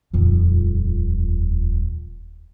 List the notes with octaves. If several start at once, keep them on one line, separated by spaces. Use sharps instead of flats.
D#1 F2